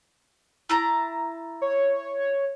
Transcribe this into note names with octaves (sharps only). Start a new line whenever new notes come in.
E4 A5 A#5
C#5